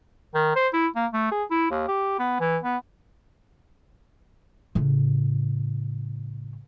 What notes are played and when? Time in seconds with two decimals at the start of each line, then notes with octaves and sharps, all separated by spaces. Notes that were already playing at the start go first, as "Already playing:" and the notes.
0.35 D#3
0.56 C5
0.73 E4
0.95 A#3
1.13 A3
1.31 G#4
1.51 E4
1.70 D#2
1.88 G4
2.19 B3
2.40 E3
2.63 B3
4.75 A2 C#3